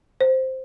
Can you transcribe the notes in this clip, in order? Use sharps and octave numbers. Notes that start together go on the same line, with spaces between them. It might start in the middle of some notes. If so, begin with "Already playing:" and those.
C5